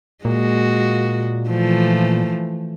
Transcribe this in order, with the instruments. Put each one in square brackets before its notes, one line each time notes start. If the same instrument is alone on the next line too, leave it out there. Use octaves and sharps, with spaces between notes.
[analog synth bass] A#2 [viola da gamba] G#3 F#4
[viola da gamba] E3 F3 A3